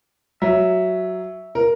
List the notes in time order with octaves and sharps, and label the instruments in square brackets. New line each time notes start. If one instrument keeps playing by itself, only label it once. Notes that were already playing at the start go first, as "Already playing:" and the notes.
[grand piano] F#3 [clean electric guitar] E5
[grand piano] A#4